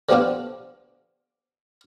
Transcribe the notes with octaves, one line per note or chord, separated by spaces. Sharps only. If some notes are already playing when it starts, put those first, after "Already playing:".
D3 F3 G3 B3 D4 F4